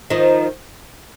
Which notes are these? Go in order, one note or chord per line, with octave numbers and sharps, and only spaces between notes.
D#3 F3